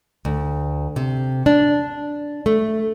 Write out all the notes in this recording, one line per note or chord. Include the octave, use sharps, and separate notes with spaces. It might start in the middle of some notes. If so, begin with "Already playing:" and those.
D2
C3
D4
A3